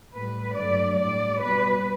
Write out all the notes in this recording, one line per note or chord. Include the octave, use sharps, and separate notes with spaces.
A2 G3 B4
G2 D3 F#3 A3 D5
A2 G3 D5
B2 G3 B4